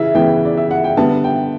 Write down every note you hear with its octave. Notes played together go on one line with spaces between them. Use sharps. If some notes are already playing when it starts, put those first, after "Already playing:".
Already playing: C#3 E3 E5
C#3 E3 B3 G5
D5
E5
F#5
G5
D3 G3 B3 A5
G5